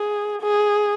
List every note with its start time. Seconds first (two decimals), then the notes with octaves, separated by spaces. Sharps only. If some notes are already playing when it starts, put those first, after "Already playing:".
Already playing: G#4
0.42 G#4